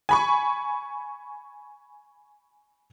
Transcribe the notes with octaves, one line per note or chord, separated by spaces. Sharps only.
G#5 B5 C#6